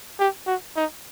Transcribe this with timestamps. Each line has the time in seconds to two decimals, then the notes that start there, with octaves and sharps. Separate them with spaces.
0.19 G4
0.47 F#4
0.76 D#4